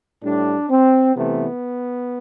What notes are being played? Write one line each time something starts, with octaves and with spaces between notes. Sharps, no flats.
A2 G3 D4
C4
C3 E3 A3 B3